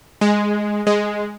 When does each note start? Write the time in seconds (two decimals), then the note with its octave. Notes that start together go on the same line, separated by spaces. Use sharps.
0.21 G#3
0.87 G#3